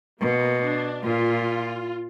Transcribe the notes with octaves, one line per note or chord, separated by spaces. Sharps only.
B2 A#3
D4
A#2 F4